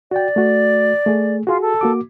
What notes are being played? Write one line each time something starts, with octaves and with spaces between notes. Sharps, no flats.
F#4 D5 G5
A3 F#4
A3 G#4
F4 F#4 G#4
A4
A#3 F#4 D6